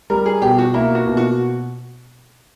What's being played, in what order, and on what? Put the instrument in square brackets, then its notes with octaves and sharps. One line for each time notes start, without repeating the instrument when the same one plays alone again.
[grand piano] G3 [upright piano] A#4
[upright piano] G#4
[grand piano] B2 [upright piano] G4
[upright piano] F#4
[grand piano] A#3 [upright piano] E4
[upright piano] F#4
[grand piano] B2
[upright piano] F#4